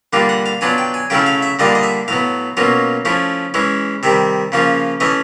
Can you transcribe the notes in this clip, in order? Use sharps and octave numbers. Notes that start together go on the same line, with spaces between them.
D3 G3 A#3 D4 F4
F#5
F5
F#3 B3 D4 F4 G#5
G5
G#5
C#3 F#3 A3 C#4 E4 G5
F5
E5
D3 G3 A#3 D4 F4 D#5
D#5
E5
A2 F#3 B3 F5
B2 F#3 A#3 C#4 F4
F3 A3 C#4 E4
E3 G#3 C#4 E4
C3 D#3 G3 E5
C#3 F3 A#3 C#4 F4
E3 A3 C#4 D#5